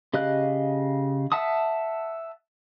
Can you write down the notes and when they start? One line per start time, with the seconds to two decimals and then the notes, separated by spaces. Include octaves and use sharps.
0.13 C#3 G4 D#5 F5 F#6
1.32 E5 F#5 A5 D#6